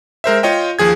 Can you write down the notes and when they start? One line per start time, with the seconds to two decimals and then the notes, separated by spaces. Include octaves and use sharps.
0.24 G#3 A#4 C5 E5
0.43 F4 C#5 D#5 G5
0.79 D#2 F3 G#4 G#6